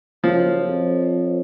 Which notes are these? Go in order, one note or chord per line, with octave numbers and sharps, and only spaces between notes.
F#1 F3 C5 C#5
F2